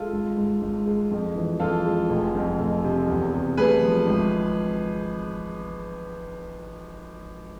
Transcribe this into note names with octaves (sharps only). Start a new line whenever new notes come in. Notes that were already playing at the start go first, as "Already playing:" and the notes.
Already playing: G#3 F4 A4
G#1
G#2
G#1
G#3
F2
E3
F2 F4 A4
G#3
F1
F2
F1
C3
E2
C3
A3 G#4 B4
F3
G#1